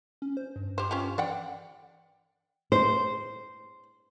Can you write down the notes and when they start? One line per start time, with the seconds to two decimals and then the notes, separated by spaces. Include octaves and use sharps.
0.22 C#4
0.37 C5
0.56 G2
0.78 G4 C5
0.91 C#4 F4 G4
1.18 E3 D5 F#5 G5
2.72 C5